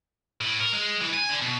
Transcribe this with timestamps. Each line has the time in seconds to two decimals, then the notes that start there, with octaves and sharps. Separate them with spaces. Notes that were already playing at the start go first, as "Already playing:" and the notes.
0.41 A2
0.60 A#4
0.73 G#3
1.01 E3
1.14 G#5
1.30 D3
1.42 B2